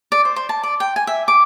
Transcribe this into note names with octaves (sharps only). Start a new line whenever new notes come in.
D5
C5
C5
A5
D5
G5
G#5
E5
D6